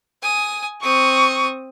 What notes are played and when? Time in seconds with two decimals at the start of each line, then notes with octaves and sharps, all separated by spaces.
0.22 G#5 D#6
0.83 C4 C#6 D#6